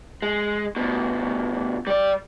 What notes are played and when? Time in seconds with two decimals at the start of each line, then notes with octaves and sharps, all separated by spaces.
0.22 G#3
0.76 D2 B2
1.87 G3 D5